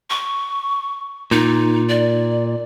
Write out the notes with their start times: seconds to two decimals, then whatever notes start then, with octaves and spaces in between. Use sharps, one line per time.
0.10 C#6
1.31 A#2 D#4
1.89 D5